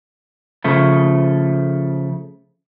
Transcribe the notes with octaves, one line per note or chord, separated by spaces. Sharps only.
C#3 F3 A3